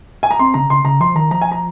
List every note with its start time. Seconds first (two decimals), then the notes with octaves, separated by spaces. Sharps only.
0.23 G#5
0.31 A#5
0.39 C4 C6
0.54 C#3 A#5
0.70 C#3 C6
0.84 C#3 A#5
1.00 F3 C6
1.15 D#3 A#5
1.31 F3 A#5
1.41 G#5
1.52 A#5